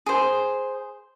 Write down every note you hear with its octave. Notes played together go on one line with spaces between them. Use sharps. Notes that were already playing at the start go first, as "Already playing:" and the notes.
G#4 C5